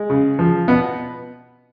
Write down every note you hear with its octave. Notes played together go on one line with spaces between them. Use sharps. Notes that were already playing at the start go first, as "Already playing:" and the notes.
Already playing: G#3
C#3
F3
B2 B3